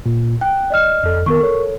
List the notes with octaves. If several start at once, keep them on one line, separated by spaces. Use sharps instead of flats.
A#2
G5 F#6
D5 D#5 F6
F2 A4
D#3 B3 A#4 C#6
A4 C#5